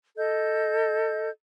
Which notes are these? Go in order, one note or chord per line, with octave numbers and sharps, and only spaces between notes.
A4 D#5 G6